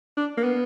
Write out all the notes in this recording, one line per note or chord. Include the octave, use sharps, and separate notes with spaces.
D4
A#3
B3